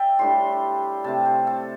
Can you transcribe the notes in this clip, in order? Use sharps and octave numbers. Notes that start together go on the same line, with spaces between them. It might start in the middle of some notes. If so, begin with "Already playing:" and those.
Already playing: D5 E5 G5
A2 G3 D4 C6
C3 A3 C4 A5
C5
A4